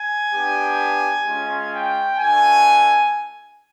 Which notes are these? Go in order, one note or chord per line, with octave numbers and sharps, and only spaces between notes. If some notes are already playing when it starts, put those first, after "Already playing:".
Already playing: G#5
B3 D4 G4
G#3 C#4 F4
G5
A3 D4 F#4 G#5